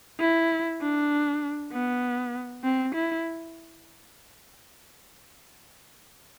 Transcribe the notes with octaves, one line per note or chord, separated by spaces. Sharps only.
E4
D4
B3
C4
E4